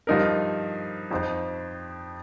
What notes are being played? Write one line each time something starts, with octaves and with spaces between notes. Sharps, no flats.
G2 F3 D#4 A#4
F2 F3 D#4 C5